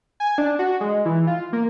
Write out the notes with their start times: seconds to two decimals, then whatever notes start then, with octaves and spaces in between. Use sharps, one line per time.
0.20 G#5
0.38 D4
0.59 F#4
0.81 G#3
1.05 E3
1.27 F4
1.53 A#3